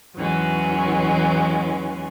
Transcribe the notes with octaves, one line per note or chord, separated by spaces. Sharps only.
E2 G#2 E3 F#3 G#3 C#4